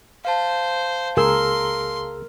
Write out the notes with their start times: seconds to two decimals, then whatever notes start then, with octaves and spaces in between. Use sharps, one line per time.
0.25 C5 F5 A5
1.17 C#2 G#4 A#4 C6 E6